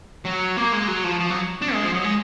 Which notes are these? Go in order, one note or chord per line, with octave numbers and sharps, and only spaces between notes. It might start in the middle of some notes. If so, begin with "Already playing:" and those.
F#3
A#3
G#3
F#3
F3
F3
F#3
D4
G#3
F3
F#3
G#3